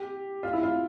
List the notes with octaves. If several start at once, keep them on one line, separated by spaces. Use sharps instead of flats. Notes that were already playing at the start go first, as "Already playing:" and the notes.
Already playing: G4
F4
E4
F4